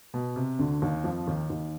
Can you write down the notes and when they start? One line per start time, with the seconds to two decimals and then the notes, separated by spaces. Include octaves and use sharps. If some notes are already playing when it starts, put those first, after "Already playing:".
0.14 B2
0.36 C3
0.59 D2 D3
0.82 D#2 D#3
1.04 F2 F3
1.27 D#2 D#3
1.50 D#2 D#3